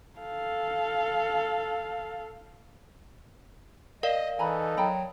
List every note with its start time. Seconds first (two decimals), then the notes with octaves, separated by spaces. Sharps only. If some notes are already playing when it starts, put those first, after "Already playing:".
0.20 A4 F5
4.03 A#4 D5 D#5 F5
4.39 E3 D#4 A4 G#5 A#5 B5
4.77 F#3 G5 A#5 B5